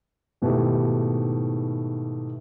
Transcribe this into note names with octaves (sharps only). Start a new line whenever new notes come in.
G#2 B2 D#3 A3 E4 G4